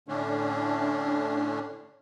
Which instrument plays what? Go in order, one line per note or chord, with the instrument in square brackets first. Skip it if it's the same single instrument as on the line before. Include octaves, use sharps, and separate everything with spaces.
[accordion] A2 D3 A3 C#4 D4